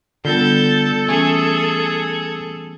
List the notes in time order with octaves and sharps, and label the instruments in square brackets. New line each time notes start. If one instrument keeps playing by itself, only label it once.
[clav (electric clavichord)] D3 [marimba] G3 B3 F4 [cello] A4 [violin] G6 A6
[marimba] E3 A3 C#4 [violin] G#4 [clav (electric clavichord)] G#5